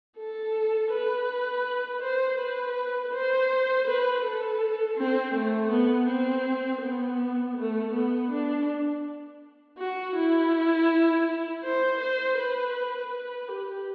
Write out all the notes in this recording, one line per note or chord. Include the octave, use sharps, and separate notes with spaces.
A4
B4
C5
B4
C5
B4
A4
C4
A3
B3
C4
B3
A3
B3
D4
F#4
E4
C5
C5
B4
B4
G4